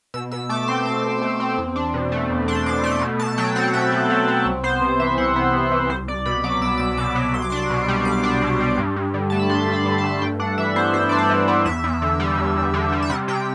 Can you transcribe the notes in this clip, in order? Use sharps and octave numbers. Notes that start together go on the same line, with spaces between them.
B2 E6
B2 E6
A3 D6
C4 C6
B2 D6
B2
A3
C4
E2
D4
B2
A3
E2
D4 C6
B2 D6
A3 C6
B2
B2 A5
F#3 G5
C4 F#5
B2 E5
B2
F#3
C4
C2
B3 C5
C3
E3 E5
C2 F#5
B3
C3
E3
C2 C5
C2 D5
B2 B5
F#3 D6
C2 E6
C2 E6
B2 D6
F#3
C2 C6
D6
D4 C6
B2
G3
C2 D6
D4
B2
G3
G2
G2
D3
A3 A5
B5
G2 C6
G2
B5
D3
A5
A3
G2 G5
D4 F#5
E3 E5
B3 C5
G2 C5
D4 D5
C5
E3
B3
E2 E5
E2
D3
G3
E2
E2
D3
G3
E5
C3 F#5
C3 G5